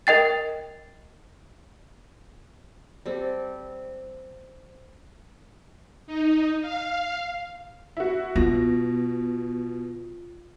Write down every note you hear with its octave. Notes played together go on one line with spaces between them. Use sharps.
A#4 D#5 G5 A6
G3 C4 A4
D#4
F5
E4 F#4
B2 F4 A#6